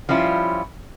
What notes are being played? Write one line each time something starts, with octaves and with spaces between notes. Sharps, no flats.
F3 G3 C#4 E4 F4